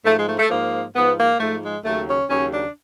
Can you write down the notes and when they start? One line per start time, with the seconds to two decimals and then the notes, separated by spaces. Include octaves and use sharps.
0.05 G#2 F3 A3
0.16 G#3
0.27 A3
0.39 A3
0.50 G#2 F3 A#3
0.95 G#2 F3 B3
1.17 A#3
1.39 G#2 F3 A3
1.61 G#3
1.84 D#2 C#3 F#3 A3
2.07 C#4
2.29 D#2 C#3 F#3 C#4
2.51 D4